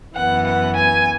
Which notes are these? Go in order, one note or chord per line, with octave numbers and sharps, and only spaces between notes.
F#2 E3 B3 F#5
F#5
G#5